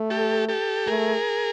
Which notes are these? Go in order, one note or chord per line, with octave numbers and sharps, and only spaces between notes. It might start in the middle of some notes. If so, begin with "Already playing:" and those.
Already playing: A3
G4 A4
G4 A4
A3 G#4 A#4